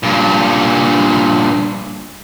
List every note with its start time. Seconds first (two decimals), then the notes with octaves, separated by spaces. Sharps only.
0.03 G2 A#2